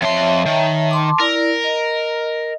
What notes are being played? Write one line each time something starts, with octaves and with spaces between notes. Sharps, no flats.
F2 C#5 E5 A5 C6
D#3
A5 C6 D6
E4 A#4 D5
D#5